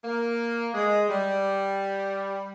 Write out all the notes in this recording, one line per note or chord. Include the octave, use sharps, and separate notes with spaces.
A#3
G#3
G3